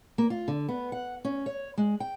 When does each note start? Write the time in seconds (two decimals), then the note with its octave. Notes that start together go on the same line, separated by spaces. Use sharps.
0.18 A#3
0.30 F4
0.48 D3
0.68 B3
0.92 F#5
1.25 C#4
1.46 C#5
1.77 G#3
2.00 G5